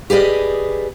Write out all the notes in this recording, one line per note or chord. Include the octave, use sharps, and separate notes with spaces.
G4 G#4 B4 D5 D#5